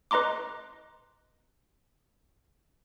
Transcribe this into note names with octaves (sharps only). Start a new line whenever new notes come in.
B4 D#5 A#5 C6 D6